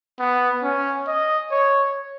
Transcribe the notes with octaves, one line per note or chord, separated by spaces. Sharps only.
B3
C#4
D#5
C#5